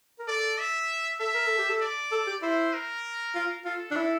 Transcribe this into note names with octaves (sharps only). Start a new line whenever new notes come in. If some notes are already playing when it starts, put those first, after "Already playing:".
A#4
A4 D5
E5
A4 E5
A#4
A4
G4
A4
D5
A4
G4
E4 C5
A#4
F4
F4 A4
D4
E4